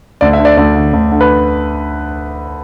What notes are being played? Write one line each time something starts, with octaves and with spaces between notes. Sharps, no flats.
D2 D5
E5
D3
D5
D2 D5
D3
D2
D3
B4